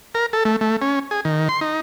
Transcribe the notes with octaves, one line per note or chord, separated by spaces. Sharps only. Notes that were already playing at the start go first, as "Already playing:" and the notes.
A#4
A4
A3
A3
C#4
G#4
D#3
C6
D#4